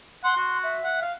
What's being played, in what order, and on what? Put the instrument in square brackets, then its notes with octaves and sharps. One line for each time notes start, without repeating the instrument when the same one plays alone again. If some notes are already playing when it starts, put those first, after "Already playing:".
[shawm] F#5 [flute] C6
[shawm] F#4
[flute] E5
[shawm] F#5
F5